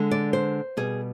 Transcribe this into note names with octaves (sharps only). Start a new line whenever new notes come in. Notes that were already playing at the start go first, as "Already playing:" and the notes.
Already playing: D3 G#3
D5
C5
B2 G3 G#4